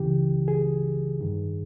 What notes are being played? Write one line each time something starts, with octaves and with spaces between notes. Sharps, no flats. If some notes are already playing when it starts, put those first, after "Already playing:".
Already playing: C#2 C#3 E3 G4
G#4
G2 D#3